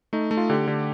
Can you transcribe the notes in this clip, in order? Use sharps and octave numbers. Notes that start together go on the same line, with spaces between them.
A3 D#4
A3
F4
D3 G4
D3